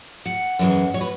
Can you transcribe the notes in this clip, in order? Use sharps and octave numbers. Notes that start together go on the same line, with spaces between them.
F#5
F#2 E3 G#3
C#5
B4